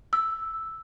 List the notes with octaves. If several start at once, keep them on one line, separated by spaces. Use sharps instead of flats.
E6